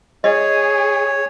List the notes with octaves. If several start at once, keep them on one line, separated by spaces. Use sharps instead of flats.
G#4 C#5 D#5